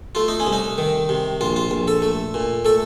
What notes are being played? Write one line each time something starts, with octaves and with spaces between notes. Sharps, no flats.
A3 F4
D#4
C#4
C2
D#4
D#3
C3
A#1 F4
F4
A#1
A4
A3
A#2
A3 A4